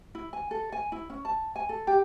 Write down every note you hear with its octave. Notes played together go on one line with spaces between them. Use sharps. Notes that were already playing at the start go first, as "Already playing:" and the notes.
E4
G#5
A4
G#5
E4
C#4
A5
G#5
A4
G4